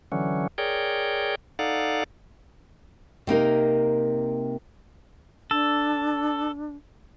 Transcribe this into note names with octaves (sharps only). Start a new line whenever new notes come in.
D3 E3 F#3 C#4
G#4 A#4 C#5 D5 G5
D#4 A4 D5 F5 F#5
C3 A#3 D#4 A#4
D4 A4